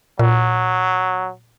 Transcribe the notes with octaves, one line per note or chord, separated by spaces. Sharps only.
A#2 F#3